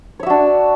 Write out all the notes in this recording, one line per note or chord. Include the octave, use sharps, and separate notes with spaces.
D4 F#4 C#5 E5